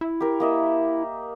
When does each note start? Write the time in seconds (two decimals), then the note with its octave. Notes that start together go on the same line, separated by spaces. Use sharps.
0.01 E4
0.20 G4 A#4
0.40 A#3 D#5 E5